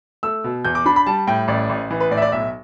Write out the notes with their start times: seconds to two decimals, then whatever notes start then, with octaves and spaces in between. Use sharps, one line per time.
0.23 A3 E6
0.44 B2
0.65 E2 G6
0.75 D6
0.86 D4 B5
0.96 B5
1.06 G3 A5
1.27 A2 G5
1.48 A1 D5
1.69 A1
1.91 E3
2.00 B4
2.11 A2 D5
2.18 E5
2.22 D5
2.32 B1 E5